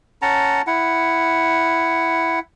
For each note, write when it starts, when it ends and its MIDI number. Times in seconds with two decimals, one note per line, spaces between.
0.22 0.62 61
0.22 0.62 78
0.22 0.62 81
0.22 0.62 82
0.67 2.39 64
0.67 2.39 78